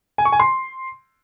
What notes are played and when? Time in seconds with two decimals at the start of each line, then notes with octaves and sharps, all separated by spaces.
0.18 G#5
0.25 C#6
0.32 G#5
0.40 C6